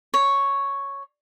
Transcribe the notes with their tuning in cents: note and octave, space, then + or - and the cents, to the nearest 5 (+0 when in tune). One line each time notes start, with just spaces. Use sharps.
C#5 +0